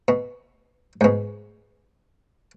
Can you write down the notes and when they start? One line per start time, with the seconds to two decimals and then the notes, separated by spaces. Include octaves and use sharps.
0.08 B2
1.01 G#2 B2